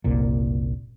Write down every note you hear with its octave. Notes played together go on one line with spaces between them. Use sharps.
F#1 C2 A#2